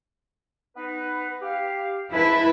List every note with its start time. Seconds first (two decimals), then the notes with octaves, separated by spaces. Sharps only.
0.77 B3 D#4 B4
1.42 G4 F5
2.13 G#2 E4 B4 G#5 A5